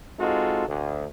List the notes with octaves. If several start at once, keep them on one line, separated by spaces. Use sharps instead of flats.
G#3 C4 D#4 F4 F#4 A4
D2